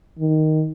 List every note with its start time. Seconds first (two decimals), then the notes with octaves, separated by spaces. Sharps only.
0.19 D#3